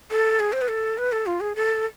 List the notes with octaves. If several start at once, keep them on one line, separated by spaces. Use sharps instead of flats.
A4
G#4
C5
B4
A4
B4
A4
F4
G#4
A4